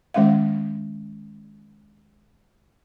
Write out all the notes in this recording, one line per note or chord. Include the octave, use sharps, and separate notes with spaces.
D#3 G#3 C#4 E5 F5